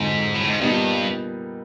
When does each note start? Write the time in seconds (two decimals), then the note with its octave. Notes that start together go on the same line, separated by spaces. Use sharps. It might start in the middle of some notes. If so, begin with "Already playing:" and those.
Already playing: F2 G#2 D3 F#3
0.34 A2
0.47 G#2
0.60 G2 A#2 G3 B3 D#4